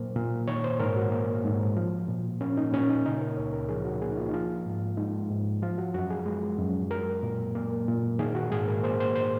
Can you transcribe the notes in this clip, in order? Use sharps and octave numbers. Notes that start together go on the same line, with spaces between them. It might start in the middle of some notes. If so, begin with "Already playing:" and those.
Already playing: A#2 F#3 A#3 C5
A#2
D#3 C#5
C5
G#2 A#4
F#4
A#3
G#2
F3
A#2
A#3 C#4
D#4
A#2 C#4
D#4
C#3 D#4
A#4
C#2 C#5
A#4
F3 G#4
F#4
A#3 G#4
D#4
F4
D#4
F3 F4
G#2
G#3 D#4
G#2
F3 F4
F#4
F#2 F#4
G#4
G#3
F#2
F#3 A#4
A#2
A#3
A#2
D#3 G#4
F#4
G#2 G#4
A#4
A#3 C5
C5
C5